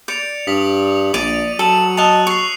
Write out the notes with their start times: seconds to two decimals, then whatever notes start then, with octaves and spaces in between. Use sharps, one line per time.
0.08 D5 G6 C#7 F7
0.47 G2 D#6 B6 F#7
1.14 A#1 D5 D#7
1.59 F#3 A4 C#7 F#7
1.97 D#5 A5 E6 F#6 F7
2.27 C#6 E6 C7